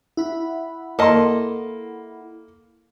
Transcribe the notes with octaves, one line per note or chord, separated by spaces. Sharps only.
E4 F#5 B5
A#3 A4 D#5 C6